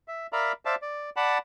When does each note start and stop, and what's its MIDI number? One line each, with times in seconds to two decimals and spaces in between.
0.08 0.27 76
0.33 0.53 70
0.33 0.53 74
0.33 0.53 76
0.33 0.53 77
0.33 0.53 82
0.33 0.53 83
0.65 0.75 72
0.65 0.75 74
0.65 0.75 76
0.65 0.75 77
0.65 0.75 81
0.82 1.10 74
1.16 1.38 74
1.16 1.38 78
1.16 1.38 81
1.16 1.38 83